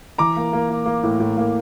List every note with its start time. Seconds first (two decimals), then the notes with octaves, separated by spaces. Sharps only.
0.18 E3 A#5 D6
0.36 A#3
0.53 A#3
0.69 A#3
0.86 A#3
1.03 A2
1.20 A2
1.37 A#3